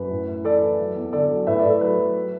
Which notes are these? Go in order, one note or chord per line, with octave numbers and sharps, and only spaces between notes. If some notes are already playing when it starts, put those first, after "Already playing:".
Already playing: F#2 B4
A2
A2
E3 A4 D5
E3
F#3
E2
D3 A4 D5
F#3
A2 B4 E5
A4 D5
A2
A4
F#3 B4
F#3
F#3